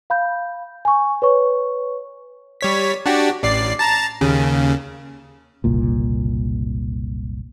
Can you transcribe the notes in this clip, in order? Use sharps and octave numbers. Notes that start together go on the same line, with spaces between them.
F5 B5 G6
G#5 C#6
B4 C#5 C#6
G3 C#5 B6
D4 F#4 G4
A1 D5 C7
A5 A#5 A6
D#2 C#3
F#1 C2 A#2